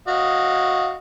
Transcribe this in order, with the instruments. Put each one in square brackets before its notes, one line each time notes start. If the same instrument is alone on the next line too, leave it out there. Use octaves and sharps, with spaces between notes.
[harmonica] F#4 D#5 F5